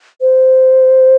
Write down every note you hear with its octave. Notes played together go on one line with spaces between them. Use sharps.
C5